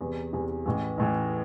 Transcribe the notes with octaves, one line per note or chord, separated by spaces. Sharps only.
E2 C3 E3
E2 C3 E3
A1 A2 E3
A1 A2 E3